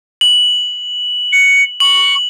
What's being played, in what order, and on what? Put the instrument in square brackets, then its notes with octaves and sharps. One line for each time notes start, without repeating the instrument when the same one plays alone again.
[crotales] F#7
[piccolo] C#7
[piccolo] C#6 [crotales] F#7